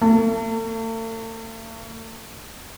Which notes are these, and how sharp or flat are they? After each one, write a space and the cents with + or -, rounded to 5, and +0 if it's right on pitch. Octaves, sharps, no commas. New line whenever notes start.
A3 +40